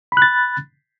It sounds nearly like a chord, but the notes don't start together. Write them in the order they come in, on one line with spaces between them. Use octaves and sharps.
B5 F#6 A6